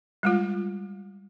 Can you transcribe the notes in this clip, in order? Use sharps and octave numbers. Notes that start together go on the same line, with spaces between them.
G3 G#3 F4